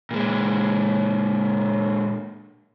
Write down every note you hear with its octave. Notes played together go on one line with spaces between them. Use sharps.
A#2 G#3